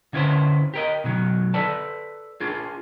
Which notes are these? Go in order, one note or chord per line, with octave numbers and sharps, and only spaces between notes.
D3 C#4 E4 B4 C5
G4 A#4 D#5
B2 D#3 F#3
A4 B4 D5 A5
D4 F4 G#4